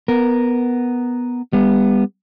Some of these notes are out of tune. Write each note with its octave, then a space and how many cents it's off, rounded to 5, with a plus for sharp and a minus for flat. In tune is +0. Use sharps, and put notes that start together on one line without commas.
B3 +0 A#4 +0
G3 +40 B3 +0